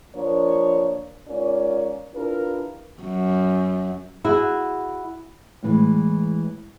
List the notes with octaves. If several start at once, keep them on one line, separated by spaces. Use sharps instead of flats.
F3 A#3 D4 A#4 C5 C#5
G#2 C#4 F4 A#4 D5
D4 E4 F4 G4 A#4 B4
F#2
E4 F#4 G#4
A2 E3 G#3